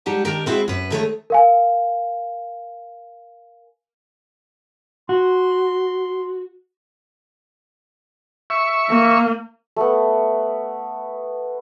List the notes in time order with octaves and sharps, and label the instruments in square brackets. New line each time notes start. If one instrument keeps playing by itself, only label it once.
[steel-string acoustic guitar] G3 G#3 D#4 G4 F#5 A5
D#3 D4 G4 A#4
G#3 C4 E4 F#4 G#4
F#2 B4
D3 D#3 A3 C4 G#4 C#5
[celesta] A#4 F5 G#5
[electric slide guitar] F#4 [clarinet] C6
[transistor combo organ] E5 C#6
[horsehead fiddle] A#3
[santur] A3 B3